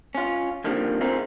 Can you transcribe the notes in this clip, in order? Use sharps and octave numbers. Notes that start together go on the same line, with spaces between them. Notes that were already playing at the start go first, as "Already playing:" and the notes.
C#4 F4
D3 D#3 F3 G3 A#3 C4
A3 C4 D#4 F4 G#4 A#4